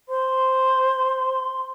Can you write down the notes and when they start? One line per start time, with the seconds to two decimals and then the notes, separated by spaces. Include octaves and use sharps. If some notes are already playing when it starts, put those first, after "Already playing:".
0.09 C5 C6